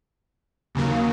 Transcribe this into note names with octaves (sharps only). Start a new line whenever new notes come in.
D#2 C#3 F#3 A#3